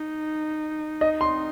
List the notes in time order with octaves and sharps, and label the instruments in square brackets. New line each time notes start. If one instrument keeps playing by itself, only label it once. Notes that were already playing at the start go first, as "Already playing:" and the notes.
Already playing: [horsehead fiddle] D#4
[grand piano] D#5
C6